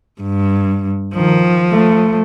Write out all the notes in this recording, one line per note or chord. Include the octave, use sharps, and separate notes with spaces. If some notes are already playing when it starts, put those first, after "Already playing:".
G2
D#3 F3
A3